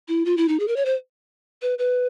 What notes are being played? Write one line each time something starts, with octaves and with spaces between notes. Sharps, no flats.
E4
F4
E4
D#4
G#4
A#4
C#5
C5
B4
B4